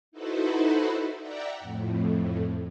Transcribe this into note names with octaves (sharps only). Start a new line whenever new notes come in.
D#4 E4 F#4 A4 B4 C5
D5 E5 F#5 G5 A#5
F2 A2